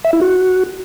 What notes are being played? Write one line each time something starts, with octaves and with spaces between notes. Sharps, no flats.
E5
E4
F#4